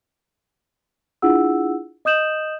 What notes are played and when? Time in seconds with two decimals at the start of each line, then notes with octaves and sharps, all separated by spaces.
1.22 D4 E4 F4 G#4 F#5 E6
2.05 D#5 D#6 G6 E7 F#7